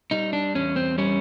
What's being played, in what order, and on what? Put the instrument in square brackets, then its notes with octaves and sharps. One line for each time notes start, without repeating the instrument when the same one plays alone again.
[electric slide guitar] G3 D#4
D4
E2 C#4
C4
G3 C#4